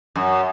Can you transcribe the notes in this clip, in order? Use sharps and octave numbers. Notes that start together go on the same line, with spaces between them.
F#2